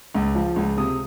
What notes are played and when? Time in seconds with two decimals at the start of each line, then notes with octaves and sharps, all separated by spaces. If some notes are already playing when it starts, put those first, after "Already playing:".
0.15 C#2
0.35 F3
0.56 C#2
0.77 C3 D#6